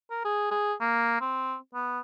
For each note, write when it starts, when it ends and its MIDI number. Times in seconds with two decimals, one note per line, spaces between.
0.11 0.25 70
0.25 0.47 68
0.51 0.74 68
0.81 1.20 58
1.21 1.56 60
1.75 2.00 59